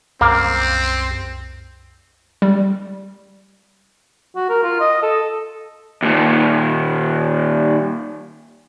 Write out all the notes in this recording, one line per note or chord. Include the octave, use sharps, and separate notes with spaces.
C2 F#2 A#3 C4
G3
F#4
A#4
F4
D#5
A4
D#2 A#2